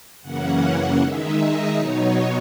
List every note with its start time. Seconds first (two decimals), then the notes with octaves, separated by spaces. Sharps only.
0.22 F#2 C#3 E3 A#3 C#4 F#5
0.99 D#3 G#3 D#4 E5
1.37 D#5
1.76 B2 F#3 B3 D#4 C#5